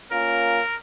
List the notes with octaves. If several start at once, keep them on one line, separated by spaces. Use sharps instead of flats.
A#3 C#4 F4 A#4